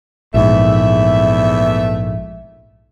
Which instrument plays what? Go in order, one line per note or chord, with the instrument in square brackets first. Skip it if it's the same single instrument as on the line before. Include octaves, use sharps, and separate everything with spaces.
[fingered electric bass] A#1 G#2 [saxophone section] E2 A3 E5